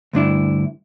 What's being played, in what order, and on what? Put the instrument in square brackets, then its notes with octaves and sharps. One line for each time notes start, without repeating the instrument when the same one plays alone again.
[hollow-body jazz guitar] D2 G2 D4 E4